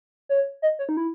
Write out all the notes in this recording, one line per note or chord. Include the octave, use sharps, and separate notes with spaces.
C#5
D#5
C#5
D#4
E4